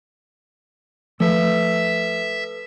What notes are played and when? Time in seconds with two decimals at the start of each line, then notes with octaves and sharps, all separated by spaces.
1.20 F3 A3 A4 B4 E5